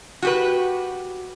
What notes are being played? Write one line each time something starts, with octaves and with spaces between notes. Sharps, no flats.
F#4 G4 B4